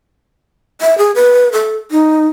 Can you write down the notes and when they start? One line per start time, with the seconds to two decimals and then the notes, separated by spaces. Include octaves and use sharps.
0.81 E5
0.98 G#4
1.15 B4
1.52 A4
1.91 D#4